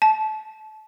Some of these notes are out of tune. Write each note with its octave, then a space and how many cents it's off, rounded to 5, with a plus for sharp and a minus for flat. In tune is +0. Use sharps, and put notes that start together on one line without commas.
A5 -25